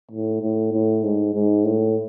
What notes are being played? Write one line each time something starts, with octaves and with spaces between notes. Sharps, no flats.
A2
A2
A2
G#2
G#2
A2